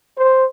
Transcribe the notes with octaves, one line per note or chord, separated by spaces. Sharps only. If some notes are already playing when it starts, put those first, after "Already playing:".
C5